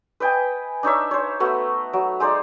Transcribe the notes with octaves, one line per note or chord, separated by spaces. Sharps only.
B4 D#5 G5 G#5
D4 D#4 C#5 E5
C5 C#5
A3 B3 F#4
F#3
G#3 D#4 C5 D5